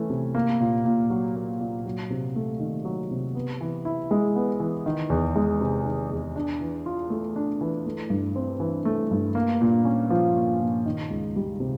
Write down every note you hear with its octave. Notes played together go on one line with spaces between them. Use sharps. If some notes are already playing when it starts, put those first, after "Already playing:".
Already playing: E3 A3 C#4
C3
A#3
A#2
A#2
F#3
A#3
A#2
F#3
C3
A3
D#3
F#3
C3
B3
E3
E4
G#3
B3
E3
D#3
E2
G#3
C3
D#3
E2
D4
E3
F4
A3
D4
E3
A3
G2
C4
E3
A3
G2
A#3
A#2
C#4
F3
A#3
A#2
D#3
C#2
G3
C3